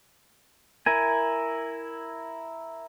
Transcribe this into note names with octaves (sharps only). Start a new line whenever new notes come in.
E4 A#4 G#5